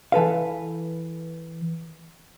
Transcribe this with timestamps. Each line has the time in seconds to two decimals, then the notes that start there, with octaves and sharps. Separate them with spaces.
0.12 E3 A4 B4 F5